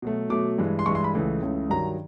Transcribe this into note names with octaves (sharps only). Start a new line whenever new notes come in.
B2 F#3 A3
B2 F#3 A3 D6
G2 E3 G#3
C6
G2 E3 G#3 C#6
C6
B5
C#2 C#3 E3 A3
C#2 C#3 E3 A3
G2 D#3 F#3 A#5